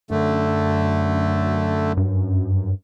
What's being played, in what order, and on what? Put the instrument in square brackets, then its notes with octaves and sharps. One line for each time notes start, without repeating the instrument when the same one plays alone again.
[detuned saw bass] F#2 [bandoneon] D3 A3
[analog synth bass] G2